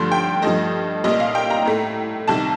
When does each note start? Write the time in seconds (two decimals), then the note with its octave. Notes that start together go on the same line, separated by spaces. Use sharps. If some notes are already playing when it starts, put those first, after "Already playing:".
Already playing: G2 D3 F3 A3 C6
0.12 G5
0.42 G2 F3 A3 D#5
1.04 C2 A#2 G3 D#5
1.20 F5
1.35 G5
1.50 A#5
1.65 A2 A3
2.27 C2 C3 D#3 A5